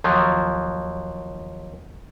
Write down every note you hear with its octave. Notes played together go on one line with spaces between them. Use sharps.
D#2 F3 F#3